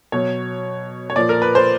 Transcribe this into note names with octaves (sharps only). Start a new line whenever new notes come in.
B2 F#3 C#5
C#5
A#2 F3 D5
A#4
B4
C5